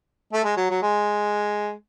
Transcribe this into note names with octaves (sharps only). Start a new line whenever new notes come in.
A3
G#3
F#3
F#3
G#3